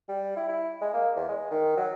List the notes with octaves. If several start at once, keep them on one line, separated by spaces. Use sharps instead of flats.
G3
E4
E4
G#3
A#3
E2
G#3
D#3
F#3